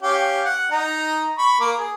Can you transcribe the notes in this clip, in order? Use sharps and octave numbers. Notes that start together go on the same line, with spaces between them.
C#4 G4 F5
F#5
D#4 A#5
B5 C#6
A#3 A#4 D6
G#4